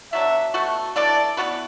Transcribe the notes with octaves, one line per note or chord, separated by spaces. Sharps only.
B2 F#3 D4 E5
B2 A3 F#4 A4
E3 A3 D4 A4 D5
E3 B3 F#4 B4